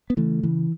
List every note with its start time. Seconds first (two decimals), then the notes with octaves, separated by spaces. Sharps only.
0.10 B3
0.17 C#3 E3 A3
0.43 C#3 E3